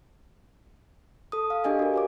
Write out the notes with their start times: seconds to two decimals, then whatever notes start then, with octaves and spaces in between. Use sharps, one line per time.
1.32 A4 D#6
1.50 F5
1.64 D4 G4 G#4 D#5 F5 G#5
1.79 F#4 A#4
1.94 F#4 C#5 D6